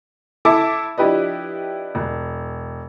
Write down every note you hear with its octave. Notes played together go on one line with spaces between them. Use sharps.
E4 A4 E5 A5 D6
F3 D4 E4 G4 B4 D#5
E1